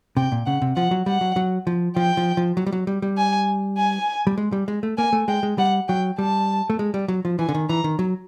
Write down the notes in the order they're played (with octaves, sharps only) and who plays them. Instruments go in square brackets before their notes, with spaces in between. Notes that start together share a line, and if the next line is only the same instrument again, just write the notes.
[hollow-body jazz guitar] C3 [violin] G5
[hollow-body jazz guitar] A#2
[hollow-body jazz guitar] C#3 [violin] F#5
[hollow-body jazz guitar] C3
[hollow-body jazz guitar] F3 [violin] F#5
[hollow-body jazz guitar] F#3
[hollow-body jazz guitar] G3 [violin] F#5
[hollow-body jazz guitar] F#3
F#3
F3
[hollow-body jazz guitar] F3 [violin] G5
[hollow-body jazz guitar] F3
F3
F#3
G3
F#3
G3
G3
[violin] G#5
G#5
[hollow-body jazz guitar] G3
G#3
G3
G#3
A3
[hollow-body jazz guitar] A#3 [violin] G#5
[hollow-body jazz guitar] A3
[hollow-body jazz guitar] G#3 [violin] G5
[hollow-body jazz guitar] G#3
[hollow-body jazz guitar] G3 [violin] F#5
[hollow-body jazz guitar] F#3 [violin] G5
[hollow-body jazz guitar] G3 [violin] A5
[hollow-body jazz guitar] A3
G#3
G3
F#3
F3
[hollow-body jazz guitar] E3 [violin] G#5
[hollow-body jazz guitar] D3
D#3
[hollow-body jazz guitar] E3 [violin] A#5
[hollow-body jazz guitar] D#3
F#3